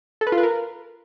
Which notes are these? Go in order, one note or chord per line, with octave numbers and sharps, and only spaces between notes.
A4
B4
F4
B4
A#4